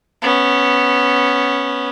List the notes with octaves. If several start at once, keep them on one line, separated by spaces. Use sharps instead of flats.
B3 C#4